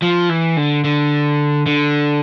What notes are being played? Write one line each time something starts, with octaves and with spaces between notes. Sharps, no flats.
F3
E3
D3
D3
D3